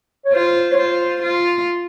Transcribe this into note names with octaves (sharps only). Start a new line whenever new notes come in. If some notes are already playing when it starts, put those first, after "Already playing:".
C#5
F4 C5
C#5
F4 C5
F4